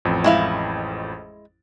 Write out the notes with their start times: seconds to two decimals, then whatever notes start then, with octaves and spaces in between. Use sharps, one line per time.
0.05 A1 F2
0.24 G#3 E4 F5